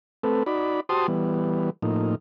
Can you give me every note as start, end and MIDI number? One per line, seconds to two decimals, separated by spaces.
0.23 0.43 57
0.23 0.43 60
0.23 0.43 69
0.23 0.43 71
0.46 0.80 63
0.46 0.80 66
0.46 0.80 74
0.46 0.80 83
0.89 1.07 66
0.89 1.07 67
0.89 1.07 72
0.89 1.07 81
0.89 1.07 84
0.89 1.07 87
1.08 1.70 52
1.08 1.70 55
1.08 1.70 59
1.82 2.15 45
1.82 2.15 53
1.82 2.15 58
1.82 2.15 63